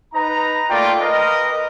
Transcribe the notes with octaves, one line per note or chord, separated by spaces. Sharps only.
D#4 B4 A#5
A3 A#3 F4 D5 G5
A#4 B4 D#5